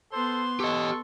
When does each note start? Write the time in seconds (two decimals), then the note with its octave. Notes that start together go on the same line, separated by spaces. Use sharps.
0.12 B3 A4 C5 C6
0.60 G4 A4 D#5 C#6